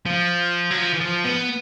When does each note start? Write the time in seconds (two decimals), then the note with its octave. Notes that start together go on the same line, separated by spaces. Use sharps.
0.06 F3
0.71 F#3
0.77 F3
0.94 E3
1.01 F3
1.24 B3